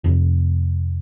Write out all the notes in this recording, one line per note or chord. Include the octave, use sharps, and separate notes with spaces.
F1